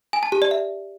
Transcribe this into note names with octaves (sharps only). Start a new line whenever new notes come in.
G#5
A5
G4
D5
E5